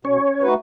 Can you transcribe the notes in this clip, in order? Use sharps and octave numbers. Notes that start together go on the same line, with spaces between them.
B2 C#4 C#5
A3 D#4 F#4 B4